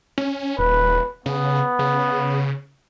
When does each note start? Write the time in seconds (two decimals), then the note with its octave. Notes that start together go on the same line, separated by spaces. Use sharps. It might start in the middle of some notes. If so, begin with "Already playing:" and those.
0.18 C#4
0.59 D#1 B4
1.26 C#3 B3
1.79 C#3